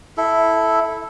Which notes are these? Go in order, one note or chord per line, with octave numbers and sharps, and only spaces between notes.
E4 A4